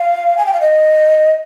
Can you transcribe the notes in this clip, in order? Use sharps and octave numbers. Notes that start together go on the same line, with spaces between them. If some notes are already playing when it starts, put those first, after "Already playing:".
Already playing: F5
G#5
G5
F5
D#5